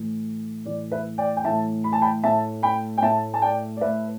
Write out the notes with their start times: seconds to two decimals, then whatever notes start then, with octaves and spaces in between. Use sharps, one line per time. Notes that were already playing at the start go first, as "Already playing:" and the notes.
Already playing: A2 E3 A3
0.65 A2 E3 A3 D5
0.91 B4 E5
1.18 D5 G5
1.37 G5
1.44 A2 E3 A3 E5 A5
1.84 B5
1.93 A5
2.02 G5 B5
2.23 A2 A3 E5 A5
2.63 G5 B5
2.98 G5
3.02 A2 A3 E5 A5
3.34 A5
3.42 D5 G5
3.77 D5
3.81 A2 A3 B4 E5